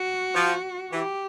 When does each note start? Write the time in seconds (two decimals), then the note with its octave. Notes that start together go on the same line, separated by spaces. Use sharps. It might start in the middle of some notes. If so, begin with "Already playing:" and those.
Already playing: F#4
0.34 F3
0.92 E3 G4